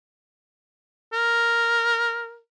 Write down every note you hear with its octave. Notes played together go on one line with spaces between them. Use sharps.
A#4